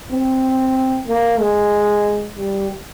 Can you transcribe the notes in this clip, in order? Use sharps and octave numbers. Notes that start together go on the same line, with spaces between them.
C4
A#3
G#3
G3